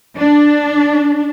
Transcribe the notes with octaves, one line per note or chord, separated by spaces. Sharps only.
D4